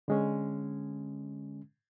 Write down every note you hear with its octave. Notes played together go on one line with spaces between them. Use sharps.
D3 G#3 C#4